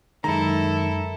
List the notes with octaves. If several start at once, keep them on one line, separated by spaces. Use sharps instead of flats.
F#2 D#3 G#3 E4 A4 A#5